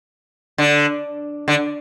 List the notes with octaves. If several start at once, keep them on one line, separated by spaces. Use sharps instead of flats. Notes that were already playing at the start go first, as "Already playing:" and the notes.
D3
D3